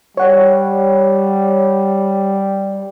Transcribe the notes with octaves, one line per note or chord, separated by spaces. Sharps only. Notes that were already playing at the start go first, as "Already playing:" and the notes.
G3 C#5 F#5